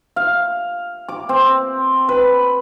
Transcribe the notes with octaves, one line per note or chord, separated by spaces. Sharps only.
F5
D6
C4
B4